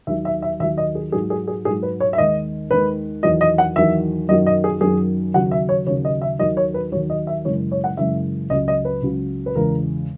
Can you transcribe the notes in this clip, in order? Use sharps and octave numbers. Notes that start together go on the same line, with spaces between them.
D#2 D#3 F#3 E5
E5
E5
D#2 D#3 F#3 E5
D#5
G#4
G#2 F#3 G#4
G#4
G#4
G#2 F#3 G#4
B4
C#5
E5
D#2 D#3 G#3 D#5
D#2 D#3 G#3 B4
E2 D#3 F#3 D#5
D#5
F#5
E2 D#3 F#3 E5
F#2 D#3 F#3 D#5
D#5
G#4
F#2 D#3 F#3 G#4
D#2 C#3 F#3 F#5
E5
C#5
D#2 C#3 F#3 C#5
D#5
E5
D#2 D#3 F#3 D#5
C#5
B4
D#2 D#3 F#3 C#5
D#5
E5
F#2 C#3 E3 G#3 C#5
C#5
F#5
F#2 C#3 E3 G#3 E5
C#2 C#3 F#3 D#5
D#5
B4
C#2 C#3 F#3
B4
E2 C#3 G#3 A#4